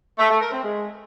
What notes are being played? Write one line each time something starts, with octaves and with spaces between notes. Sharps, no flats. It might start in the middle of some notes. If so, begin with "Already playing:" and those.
A3
A3
A#4
C4
G#3